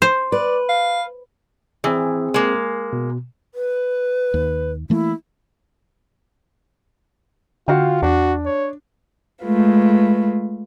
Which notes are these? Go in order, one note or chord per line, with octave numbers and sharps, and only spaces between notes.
C5
B4 D5
F5
E3 C4 G#4
G#3 A#3
B2
B4
D#2
E3 A3 A#3 E4
D3 F4 F#4 F5 G5
E2 D4 F#4
C#5
G#3 A3 F4 B4